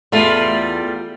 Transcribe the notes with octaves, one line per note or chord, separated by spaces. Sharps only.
E2 G3 A3 F4